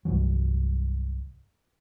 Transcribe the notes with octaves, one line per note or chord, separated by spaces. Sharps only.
C2 G2 E3 F#3